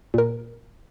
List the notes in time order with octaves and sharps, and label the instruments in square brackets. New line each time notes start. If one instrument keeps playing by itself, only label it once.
[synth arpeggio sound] A#2 A#4